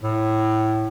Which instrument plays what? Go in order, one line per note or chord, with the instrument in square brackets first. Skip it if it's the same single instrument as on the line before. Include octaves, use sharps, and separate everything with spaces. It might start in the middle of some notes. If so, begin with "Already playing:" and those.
[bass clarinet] A2